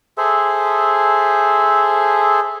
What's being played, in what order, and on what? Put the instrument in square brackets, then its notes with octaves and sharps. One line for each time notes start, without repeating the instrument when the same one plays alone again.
[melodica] G#4 A4 C5 E5